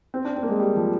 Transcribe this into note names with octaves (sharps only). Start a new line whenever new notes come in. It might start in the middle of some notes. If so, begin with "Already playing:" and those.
C4
D4
C4
A#3
G#3
G3
F3